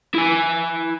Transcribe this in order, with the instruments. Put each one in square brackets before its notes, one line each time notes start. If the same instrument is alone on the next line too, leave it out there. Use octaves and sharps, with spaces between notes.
[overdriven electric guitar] E4 G#5